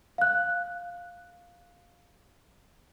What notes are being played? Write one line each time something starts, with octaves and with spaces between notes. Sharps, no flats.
F5 F#6